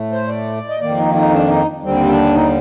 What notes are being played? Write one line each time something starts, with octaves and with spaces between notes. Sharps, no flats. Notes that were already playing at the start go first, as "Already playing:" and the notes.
Already playing: A2 A3
C5
D5
D#5
F2 D#3 A#3 D5
D#4
D#4
D4
D#4
D#2 D3 G3 C4
D4
D#4